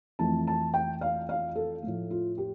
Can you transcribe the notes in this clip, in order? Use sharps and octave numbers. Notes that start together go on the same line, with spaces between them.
F2 E3 A3 A5
A5
G5
F5
F5
A4
A2 F3 A3
F4
G4